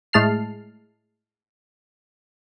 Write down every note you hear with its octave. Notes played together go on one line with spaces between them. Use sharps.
A2 G#3 A5 F6 C7